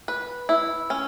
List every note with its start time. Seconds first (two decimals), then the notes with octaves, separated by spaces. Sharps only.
0.08 B4
0.49 E4
0.90 C#4